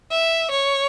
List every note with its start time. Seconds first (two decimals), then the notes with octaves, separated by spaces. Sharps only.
0.11 E5
0.51 C#5